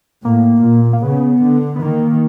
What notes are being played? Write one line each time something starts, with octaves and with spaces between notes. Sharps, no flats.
A2 A#3
A#2
A#3
C#3 B3
D3
B3
D#3 A#3